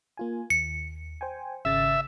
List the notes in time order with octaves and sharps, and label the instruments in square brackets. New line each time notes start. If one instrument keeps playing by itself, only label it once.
[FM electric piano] A#3 F4 G#5
[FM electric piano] D#2 [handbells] C#7
[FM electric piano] C5 G5 G#5
[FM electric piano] G#1 C#3 A6 [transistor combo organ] E5